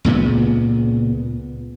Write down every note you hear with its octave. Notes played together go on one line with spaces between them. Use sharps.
C#2 A#2 C#3 B3